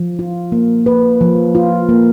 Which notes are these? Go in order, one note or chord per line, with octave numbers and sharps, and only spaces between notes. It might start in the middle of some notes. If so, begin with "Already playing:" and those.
Already playing: F3
F4
A#3
B4
F3
F4
A#3